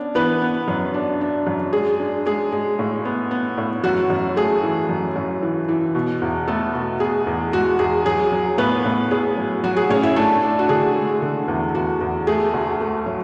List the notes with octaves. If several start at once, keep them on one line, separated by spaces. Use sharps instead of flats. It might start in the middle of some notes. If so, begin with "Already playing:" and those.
Already playing: B3 C#4 D4
E3 B3 B4
B3
F#2
D4
D4
F#2
G#3 G#4
D4
G#3 G#4
G#3
A2
B3
B3
A2
F#2 F#4
F#2
A3 G#4
E3
F#2
F#2
E3
E3
B2
E2
A3 B3 A4
B2
B3 G#4
E2
G#3 F#4
E2 G#4
F#3 G#4
F#3
A2 B3 B4
A2
A2 G#4
F#3
F#3 F#4
G#4
A2 C#4 C#5
E4 E5
A3 D4 A4
D4
F#4
D3 G#4
G#3
D3
E2
E2 F#4
E2
A3 G#4
D2
A3
F#3